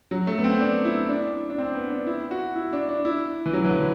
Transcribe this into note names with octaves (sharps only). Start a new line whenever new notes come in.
F#3
A3
B3
C4
D4
E4
D4
D4
C4
B3
D4
E4
F#4
E4
D4
D4
E4
E3
F#3
E3
D3